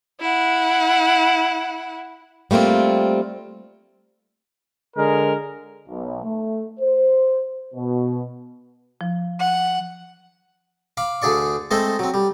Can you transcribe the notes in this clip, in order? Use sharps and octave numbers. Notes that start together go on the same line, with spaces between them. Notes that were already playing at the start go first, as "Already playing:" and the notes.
E4 F#5
G3 A3 A#3 C4 F4
D3 G#3 A#4
B1
A3
C5
B2
F3
F#5
F5 B5 D6
D2 D3 G#4 D5 C#6
G#3 A3 C4 A4 C5 D#5
F#3 C4
G3